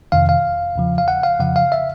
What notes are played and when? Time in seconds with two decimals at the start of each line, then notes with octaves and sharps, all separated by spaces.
0.12 F2 C3 D#3 F5
0.29 F5
0.76 E2 C#3 F3
0.98 F5
1.08 F#5
1.24 F5
1.40 F2 C#3 F3 F#5
1.56 F5
1.72 E5